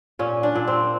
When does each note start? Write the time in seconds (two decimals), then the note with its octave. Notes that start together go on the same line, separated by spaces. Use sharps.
0.19 A#2 C#4
0.43 D4
0.55 A#2
0.67 C4